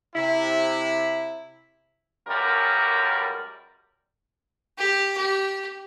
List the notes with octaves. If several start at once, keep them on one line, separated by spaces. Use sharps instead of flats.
C3 E4
C#2 F#2 G3 A#4
G4
G4